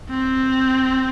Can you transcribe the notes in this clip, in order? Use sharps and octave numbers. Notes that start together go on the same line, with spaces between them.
C4